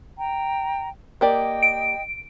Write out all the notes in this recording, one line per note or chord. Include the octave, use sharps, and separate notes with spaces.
G5 A#5
A#3 G4 D5 D#5 G5
D7